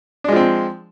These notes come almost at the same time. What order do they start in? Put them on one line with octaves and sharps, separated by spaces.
D4 G#3 F3 C4